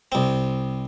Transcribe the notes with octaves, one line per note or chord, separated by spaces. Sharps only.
C2 C4